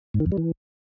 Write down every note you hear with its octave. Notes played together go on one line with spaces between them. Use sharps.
G#2
D#3
F2
G3
E3